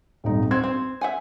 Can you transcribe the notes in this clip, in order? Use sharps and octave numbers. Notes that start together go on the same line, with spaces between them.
D#1 G#1 D#4
C4 F#4 G#6
C4
E5 F#5 G#5